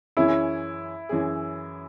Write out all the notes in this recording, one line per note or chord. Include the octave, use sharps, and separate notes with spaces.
F#2 E3 C#4 E4 G#4
F#2 E3 C#4 G#4